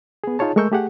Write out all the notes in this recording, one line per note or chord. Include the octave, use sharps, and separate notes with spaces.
B3 G#4
D#4 F4 G#4 C#5 A5
G#3 A3 A#4 C#6 E6 G6
A3 G4 G#4 F#5